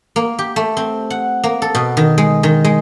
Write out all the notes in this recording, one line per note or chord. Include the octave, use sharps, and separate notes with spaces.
A#3
G4
A3
C4
F#5
A#3
A4
B2
D#3
G#3
D#3
G#3